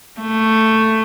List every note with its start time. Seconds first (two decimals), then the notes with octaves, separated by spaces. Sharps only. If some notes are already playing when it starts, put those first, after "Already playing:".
0.20 A3